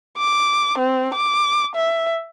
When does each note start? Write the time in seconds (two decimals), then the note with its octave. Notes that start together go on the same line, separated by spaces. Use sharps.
0.18 D6
0.78 C4
1.15 D6
1.76 E5